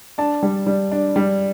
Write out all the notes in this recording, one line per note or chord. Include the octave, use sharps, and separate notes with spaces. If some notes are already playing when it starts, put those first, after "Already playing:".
D4 A5
G3
G3
D4
G3